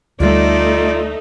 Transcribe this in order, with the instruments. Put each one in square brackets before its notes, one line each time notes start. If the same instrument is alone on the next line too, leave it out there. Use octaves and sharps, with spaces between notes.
[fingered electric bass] D2 G3 [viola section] A3 D#4 [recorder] F4 [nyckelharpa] D5